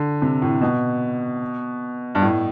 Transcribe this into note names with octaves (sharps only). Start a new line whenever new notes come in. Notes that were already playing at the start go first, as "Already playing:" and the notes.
Already playing: D3
C3
A2
B2
G2
A2